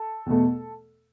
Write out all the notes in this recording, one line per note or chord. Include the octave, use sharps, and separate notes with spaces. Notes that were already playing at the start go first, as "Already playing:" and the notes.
Already playing: A4
E2 B2 A3